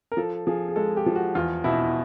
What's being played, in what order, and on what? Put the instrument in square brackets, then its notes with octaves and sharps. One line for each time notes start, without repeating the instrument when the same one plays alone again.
[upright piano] A#4
F3 A4
F3 G#4
G#4
G#3 A4
G4
F3
F#4
E2 F4
B2 E4